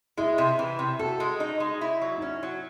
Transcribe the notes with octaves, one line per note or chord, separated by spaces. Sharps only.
G#3 E4
C3
E3
C3
F#4 A4
G#3
D#4
G#3
E4
F#3
D#4
C#4 E4
F#3